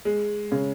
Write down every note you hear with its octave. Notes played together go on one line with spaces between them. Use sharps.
G#3
C#3